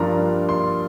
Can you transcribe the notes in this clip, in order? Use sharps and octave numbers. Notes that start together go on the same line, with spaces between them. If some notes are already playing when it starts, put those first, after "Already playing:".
Already playing: G2 F3 A#3 D4 F4 A#5
C6